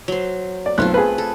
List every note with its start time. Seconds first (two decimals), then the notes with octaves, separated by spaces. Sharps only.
0.08 F#3 C5
0.66 D5
0.78 B1 A3 C4 F4 F#6
0.94 G#4 B4
1.18 A4